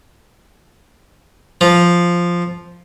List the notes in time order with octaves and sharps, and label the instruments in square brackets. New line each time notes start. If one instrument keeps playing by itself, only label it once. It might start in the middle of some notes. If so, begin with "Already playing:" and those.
[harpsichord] F3